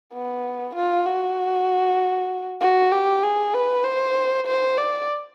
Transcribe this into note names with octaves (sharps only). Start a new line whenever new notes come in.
B3
F4
F#4
F#4
G4
G#4
B4
C5
C5
D5